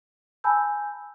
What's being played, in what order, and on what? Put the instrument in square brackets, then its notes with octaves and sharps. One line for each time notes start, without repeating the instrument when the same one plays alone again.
[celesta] G#5 A5 B5 E6 G6